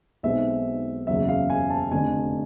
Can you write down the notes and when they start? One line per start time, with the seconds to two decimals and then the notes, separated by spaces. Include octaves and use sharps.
0.23 B1 B2 G#3 C4 D#4 E5
1.07 F#1 E2 C#3 F#3 E5
1.29 F5
1.50 G#5
1.70 A5
1.91 F1 F2 D3 G#5